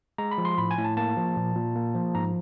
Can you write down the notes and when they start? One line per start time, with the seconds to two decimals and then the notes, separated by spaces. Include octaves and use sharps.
0.18 G#3 A#5
0.31 B5
0.38 F3
0.45 C6
0.58 A2 B5
0.71 G#5
0.78 A2
0.84 A5
0.97 A#3 A5
1.17 F3
1.37 A#2
1.55 A#2
1.75 A#3
1.95 F3
2.15 G#2 A#5